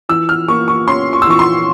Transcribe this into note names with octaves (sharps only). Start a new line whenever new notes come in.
E3 E6
F6
A#3 C#6
C#6
C#4 C6
C#6
E6
E3 C#6
C6